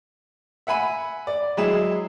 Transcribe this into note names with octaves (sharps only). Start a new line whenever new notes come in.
E5 F#5 G#5 B5 D#7
D5
F#3 G#3 E4 G#4 E7